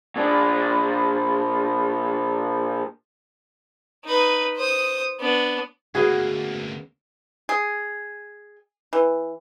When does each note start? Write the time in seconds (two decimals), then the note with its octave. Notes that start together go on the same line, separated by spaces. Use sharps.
0.16 A#2 D4
4.05 D#4 B4
4.56 C5 D#6
5.20 B3 D4
5.95 D2 A#3 B3 C#4 F#4 G#4
7.49 G#4
8.93 E3